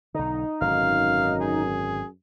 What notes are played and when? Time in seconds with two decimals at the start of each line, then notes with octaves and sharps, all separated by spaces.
0.14 B1 D3 D#4
0.61 G#1 F#2 B2 D3 F5
1.41 G#4